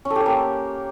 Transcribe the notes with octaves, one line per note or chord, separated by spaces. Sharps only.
C#4
A4
G4
C#5
A#3